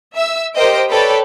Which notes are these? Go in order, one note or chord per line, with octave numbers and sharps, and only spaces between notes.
E5 E6
G4 A#4 C5 D#5 G5 D7
A4 B4 C#5 D5 G5 B5